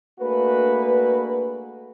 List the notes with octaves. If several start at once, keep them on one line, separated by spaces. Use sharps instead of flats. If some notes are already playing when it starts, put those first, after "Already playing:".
A3 A#3 D4 F#4 G#4 B4